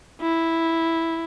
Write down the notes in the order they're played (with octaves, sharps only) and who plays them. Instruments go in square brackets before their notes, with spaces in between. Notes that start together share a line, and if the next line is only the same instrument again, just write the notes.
[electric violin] E4